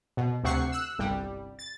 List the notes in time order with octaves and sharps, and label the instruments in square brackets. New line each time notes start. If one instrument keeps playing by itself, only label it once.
[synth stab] B2
D2 C3 F#5 C#6 C7
E6 F#6
G1 C2 G3
A6